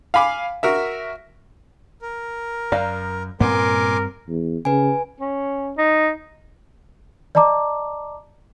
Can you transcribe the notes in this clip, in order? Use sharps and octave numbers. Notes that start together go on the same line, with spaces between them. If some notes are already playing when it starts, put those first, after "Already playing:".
F5 G#5 B5 D6
F#4 A#4 E5
A#4
F#2 D5 F5 A#5
G2 A#2 B3 C4 A#4 G#5 C6 D6
E2
C#3 B4 G#5
C#4
D#4
D5 D#5 A5 A#5 D6